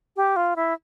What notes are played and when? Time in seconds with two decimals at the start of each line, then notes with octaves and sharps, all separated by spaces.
0.16 G4
0.36 F4
0.56 E4